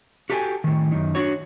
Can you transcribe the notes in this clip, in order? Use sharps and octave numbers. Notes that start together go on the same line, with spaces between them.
F#4 G4 A4 B4 G5 G#5
A2 D#3
F#2 D#3
D4 F#4 C#5